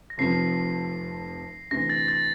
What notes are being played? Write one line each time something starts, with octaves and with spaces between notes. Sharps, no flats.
A#6
F1 F2 C3 F3 C7
D2 C3 E3 A#6
A6
A6